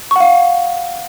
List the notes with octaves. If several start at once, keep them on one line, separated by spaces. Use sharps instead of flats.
F5 F#5 C#6